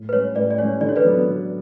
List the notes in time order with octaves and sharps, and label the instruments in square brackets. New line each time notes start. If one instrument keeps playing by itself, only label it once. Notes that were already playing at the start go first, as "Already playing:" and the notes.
Already playing: [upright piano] A2
[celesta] B4
[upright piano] G3 C#4 [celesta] C#5
[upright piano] A2 [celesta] B4 D5
[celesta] D5
[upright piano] G3 C#4 [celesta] C#5
[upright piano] D3 [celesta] D5
[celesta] C#5
B4 D5
[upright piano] F#3 B3 D4
D3